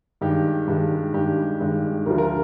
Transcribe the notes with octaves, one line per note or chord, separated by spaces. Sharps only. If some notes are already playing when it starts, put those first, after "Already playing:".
G2 D#3 G#3 G4
G2 D#3 G#3
G2 D#3 G#3 G4
G2 D#3 G#3
D2 D3 F3 A#4
A#4